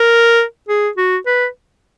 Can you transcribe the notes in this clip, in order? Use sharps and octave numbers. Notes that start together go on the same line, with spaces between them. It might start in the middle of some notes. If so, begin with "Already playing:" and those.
Already playing: A#4
G#4
F#4
B4